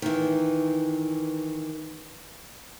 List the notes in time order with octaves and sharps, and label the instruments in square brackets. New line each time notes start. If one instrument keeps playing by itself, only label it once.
[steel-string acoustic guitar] D#3 E3